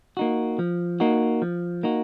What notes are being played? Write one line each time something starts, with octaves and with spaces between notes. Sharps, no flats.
A#3 D#4 F#4
F3
A#3 D#4 F#4
F3
A#3 D#4 F#4